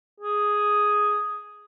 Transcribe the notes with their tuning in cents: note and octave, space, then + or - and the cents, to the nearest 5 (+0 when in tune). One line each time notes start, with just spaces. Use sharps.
G#4 +0